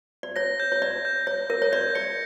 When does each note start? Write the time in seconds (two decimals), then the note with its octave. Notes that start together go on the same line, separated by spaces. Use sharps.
0.23 D5
0.36 C#5 A#6
0.60 G6
0.72 C#5
0.82 D5 G6
1.05 G6
1.27 C#5 A#6
1.50 A#4 A#6
1.62 C#5
1.72 D5 G6
1.95 D5 C#7